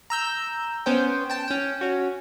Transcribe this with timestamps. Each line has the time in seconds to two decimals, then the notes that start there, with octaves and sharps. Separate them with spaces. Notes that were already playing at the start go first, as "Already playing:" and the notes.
0.10 A#5 E6 G6
0.86 B3 C#4 C5 G5
1.30 G5 A5
1.48 C#4 G5
1.81 C#4 F#4